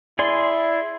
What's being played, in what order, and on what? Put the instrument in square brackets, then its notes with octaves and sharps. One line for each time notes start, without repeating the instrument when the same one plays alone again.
[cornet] E4 [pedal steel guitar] G#4 D5 C6